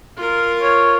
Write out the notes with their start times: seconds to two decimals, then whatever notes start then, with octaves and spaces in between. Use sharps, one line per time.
0.17 F4 A#4
0.62 C#5